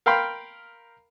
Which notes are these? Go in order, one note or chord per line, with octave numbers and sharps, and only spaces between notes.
A#4 F5 G5 B5 C6